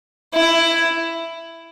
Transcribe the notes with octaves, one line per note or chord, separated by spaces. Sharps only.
E4